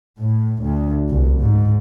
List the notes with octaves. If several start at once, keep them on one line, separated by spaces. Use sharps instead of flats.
A2
D2
C2
G#2